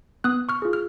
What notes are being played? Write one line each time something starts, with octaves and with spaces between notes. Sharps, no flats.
B3 D#6 F#6
C#6 F6
F4 G#4
F6